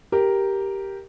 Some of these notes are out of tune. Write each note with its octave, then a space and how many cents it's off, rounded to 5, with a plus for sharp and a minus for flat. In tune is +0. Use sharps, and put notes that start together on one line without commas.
G4 +0 A#4 +0